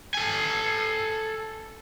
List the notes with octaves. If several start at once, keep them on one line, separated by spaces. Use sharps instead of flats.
A4 G#5